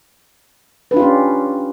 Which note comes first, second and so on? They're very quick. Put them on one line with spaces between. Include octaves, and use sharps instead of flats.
B4 D4 F4 G4 C#4